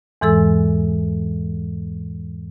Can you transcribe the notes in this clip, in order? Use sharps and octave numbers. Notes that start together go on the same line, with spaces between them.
E2 G#2 E3 G#3 A4 E6